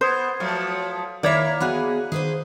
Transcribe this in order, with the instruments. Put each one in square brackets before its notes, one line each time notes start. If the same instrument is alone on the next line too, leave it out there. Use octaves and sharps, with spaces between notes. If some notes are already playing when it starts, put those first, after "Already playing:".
[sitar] B3 [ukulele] C5 [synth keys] C6 D#6 G#6
[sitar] F3 F#3 A3
[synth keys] D#3 B5 B6 [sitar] A#3 [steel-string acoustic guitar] E4 E5 [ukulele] C#5 D5
[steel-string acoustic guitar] B3 F#4 G#4 [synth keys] B5 F#6
[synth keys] D#3 [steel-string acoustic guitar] G#4 B4 C5